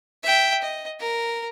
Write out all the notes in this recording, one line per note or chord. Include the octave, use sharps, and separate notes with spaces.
E5 G5
D#5
A#4